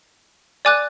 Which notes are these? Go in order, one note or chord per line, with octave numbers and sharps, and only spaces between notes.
D5 G#5 D6 F#6